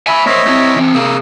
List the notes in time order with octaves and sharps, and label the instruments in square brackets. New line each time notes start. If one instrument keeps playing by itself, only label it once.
[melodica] E5 [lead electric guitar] G#5 B5
[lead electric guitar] A#3 C5 [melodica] C#5 D#5 E5
[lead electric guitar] C4 E4
E3 C4
[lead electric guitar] C3 G#4 [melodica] A#3 D#6 E6